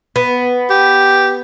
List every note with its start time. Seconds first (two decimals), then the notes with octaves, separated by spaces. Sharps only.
0.16 B3
0.70 G4